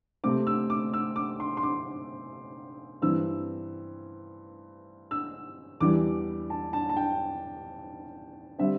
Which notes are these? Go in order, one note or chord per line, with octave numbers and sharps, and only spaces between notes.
C3 A3 C4 D6
E6
D6
E6
D6
C6
C6
D6
G2 E3 C4 E6
E6
E2 E3 G3 D4 D6
A5
A5
A5
G5
D3 G3 C4 E5